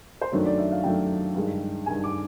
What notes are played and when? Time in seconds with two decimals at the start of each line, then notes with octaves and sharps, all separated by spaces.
0.21 C5
0.32 F#2 D#3 F#3 A3 D4 C#5
0.46 D5
0.58 E5
0.71 F5
0.84 F#2 D#3 F#3 A3 D4 G5
1.35 G2 D#3 G#3
1.86 G2 D#3 G#3 G#5
2.04 D6